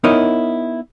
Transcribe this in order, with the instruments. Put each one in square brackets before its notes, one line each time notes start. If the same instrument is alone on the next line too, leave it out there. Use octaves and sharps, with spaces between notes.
[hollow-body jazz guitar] B3 D#4 E4 A#4 C#5 D#5